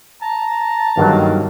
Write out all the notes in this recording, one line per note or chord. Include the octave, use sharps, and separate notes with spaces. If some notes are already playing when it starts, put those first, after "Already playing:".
A5 A#5
G1 G2 D#3 F#3 A#3